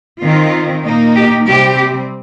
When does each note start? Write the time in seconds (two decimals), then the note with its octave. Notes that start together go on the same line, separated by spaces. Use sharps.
0.22 D#3 C4 D#4 F4
0.85 A#2 A#3 D#4
1.17 G4
1.47 C3 G3 C4 G4